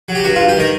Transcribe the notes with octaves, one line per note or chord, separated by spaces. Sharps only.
F#3
G4
G2 F#4
F4
G2
G4
D#3 A#4